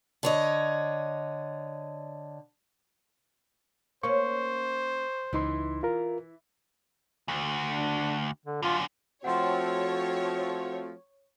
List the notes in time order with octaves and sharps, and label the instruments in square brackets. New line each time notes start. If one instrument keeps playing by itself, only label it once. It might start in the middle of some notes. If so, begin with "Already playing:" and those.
[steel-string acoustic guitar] D3 C#5 D#5
[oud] A#3 C#4 [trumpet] C5 [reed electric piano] C#6
[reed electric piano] C#2 D#4 C6 [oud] E3
[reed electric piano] F4 A#4
[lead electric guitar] D2
[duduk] D4
D3
[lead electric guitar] F#2 D3 [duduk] F4
[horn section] F3 A3 C4 [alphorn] F#4 [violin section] C#5 [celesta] F#5 G5 C6